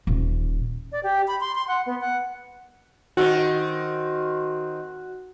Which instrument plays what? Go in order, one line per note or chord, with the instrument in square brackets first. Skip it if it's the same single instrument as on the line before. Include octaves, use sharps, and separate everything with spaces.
[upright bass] D#1
[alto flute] D5
G4
B5
C6
C6
F#5
B3
F#5
[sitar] D#3 C4 [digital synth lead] F#4